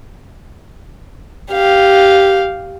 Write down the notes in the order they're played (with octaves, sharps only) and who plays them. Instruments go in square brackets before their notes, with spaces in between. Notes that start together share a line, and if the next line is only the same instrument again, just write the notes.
[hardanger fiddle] G4 F5